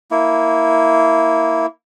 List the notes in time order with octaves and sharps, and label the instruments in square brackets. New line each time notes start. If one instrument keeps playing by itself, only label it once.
[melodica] A#3 E4